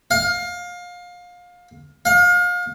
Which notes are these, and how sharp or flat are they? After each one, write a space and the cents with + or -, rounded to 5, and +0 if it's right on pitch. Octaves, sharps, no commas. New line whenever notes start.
F5 +25
F5 +35